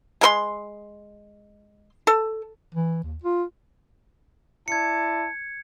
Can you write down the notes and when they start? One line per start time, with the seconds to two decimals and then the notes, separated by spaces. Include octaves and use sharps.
0.21 G#3 A#4 C6
2.07 A4
2.75 E3
3.03 D#2
3.24 F4
4.68 E4 D5 A5 G#6 C#7